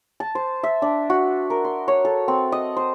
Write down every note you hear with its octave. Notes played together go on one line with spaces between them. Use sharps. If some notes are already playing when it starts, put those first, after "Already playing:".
A5
C5
E5
D4
F#4
A#4
C6
C#5
A4
C4
D#5
C5